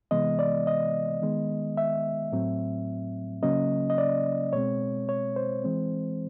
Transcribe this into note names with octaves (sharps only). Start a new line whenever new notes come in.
C3 E3 G#3 B3 D#5
D5
D#5
D#3 G#3 B3
E5
A2 F#3 A3 C4
C#3 F#3 A#3 C#4 D#5
D#5
D5
B2 G#3 C4 C#5
C#5
C5
E3 G#3 C4